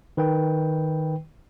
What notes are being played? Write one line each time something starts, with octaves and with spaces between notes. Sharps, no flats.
D#3 B4 G5